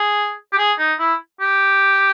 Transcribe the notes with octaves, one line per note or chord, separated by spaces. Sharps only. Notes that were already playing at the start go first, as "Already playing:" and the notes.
Already playing: G#4
G4
G#4
D#4
E4
G4